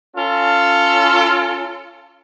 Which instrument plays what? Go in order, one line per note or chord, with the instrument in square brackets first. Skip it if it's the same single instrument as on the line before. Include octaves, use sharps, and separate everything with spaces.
[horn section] C#4 F4 A4